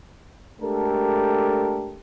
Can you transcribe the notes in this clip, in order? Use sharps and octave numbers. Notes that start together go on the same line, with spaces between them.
G#3 A3 D4 G4 A4 A#4